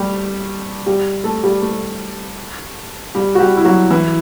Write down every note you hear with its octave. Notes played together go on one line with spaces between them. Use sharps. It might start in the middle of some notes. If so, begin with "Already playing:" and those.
Already playing: G3 A3 G4
G3 G4
A3 A4
G3 G4
A3 A4
G3 G4
F#4
G3 G4
E4
F#3 F#4
E3 E4